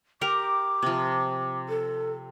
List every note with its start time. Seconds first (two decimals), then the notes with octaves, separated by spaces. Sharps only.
0.21 G4 A#4 D6
0.82 C3 F3
1.69 A4